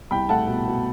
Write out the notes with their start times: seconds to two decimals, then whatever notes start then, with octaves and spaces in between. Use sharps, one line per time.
0.11 C2 G5 B5
0.29 A3 F#5 A5
0.47 B2
0.67 B2